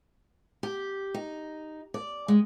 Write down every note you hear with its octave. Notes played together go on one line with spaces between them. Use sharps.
G4
D#4
D5
G#3